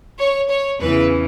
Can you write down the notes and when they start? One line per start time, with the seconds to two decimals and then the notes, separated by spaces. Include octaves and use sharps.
0.18 C#5
0.49 C#5
0.80 E2 C#3 E3 B4